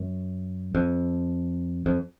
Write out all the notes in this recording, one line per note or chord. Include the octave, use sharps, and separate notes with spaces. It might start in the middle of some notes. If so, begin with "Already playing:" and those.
Already playing: F#2
F2
F2